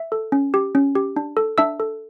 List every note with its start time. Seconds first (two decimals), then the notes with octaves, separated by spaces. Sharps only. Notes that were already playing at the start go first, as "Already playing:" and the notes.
Already playing: E5
0.12 A4
0.32 C#4
0.54 G4
0.75 C#4
0.95 G4
1.16 D4
1.37 A4
1.58 D4 E5 E6
1.80 A4